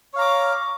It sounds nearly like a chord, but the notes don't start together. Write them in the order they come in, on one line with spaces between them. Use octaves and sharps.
C#5 F5 A#5 D6